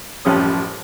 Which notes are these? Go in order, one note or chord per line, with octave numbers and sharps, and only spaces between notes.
A1 F#2 F3 G3 C#4 D#6